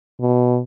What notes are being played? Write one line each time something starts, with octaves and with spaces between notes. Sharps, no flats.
B2